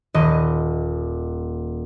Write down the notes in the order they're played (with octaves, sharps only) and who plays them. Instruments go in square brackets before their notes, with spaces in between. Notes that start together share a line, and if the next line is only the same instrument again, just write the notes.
[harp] D#1 B4 D#5